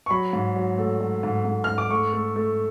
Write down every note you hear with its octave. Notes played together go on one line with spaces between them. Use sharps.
C#6
F#3 B5
G#2
F#3
A3
F#3
G#2
G#2
G#2 F6
D6
A3 C#6
A3
A3